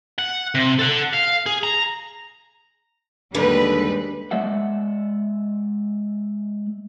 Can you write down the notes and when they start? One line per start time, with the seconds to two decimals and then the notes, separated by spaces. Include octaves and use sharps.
0.18 F#5
0.55 C3
0.79 A4 F#5
1.13 F5
1.46 G#4
1.63 A#5
3.34 D#2 D3 G3 G#3 B4
4.31 G#3 D5 E5 F#5